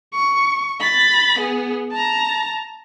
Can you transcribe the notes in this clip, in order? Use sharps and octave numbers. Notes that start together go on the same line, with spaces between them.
C#6
B5 A6
B3 G#4
A5 A#5